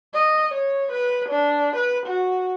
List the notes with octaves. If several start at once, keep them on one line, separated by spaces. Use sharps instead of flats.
D#5
C#5
B4
D4
B4
F#4